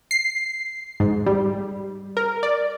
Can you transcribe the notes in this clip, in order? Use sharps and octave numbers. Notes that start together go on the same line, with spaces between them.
C7
G#2
G3
A#4
D5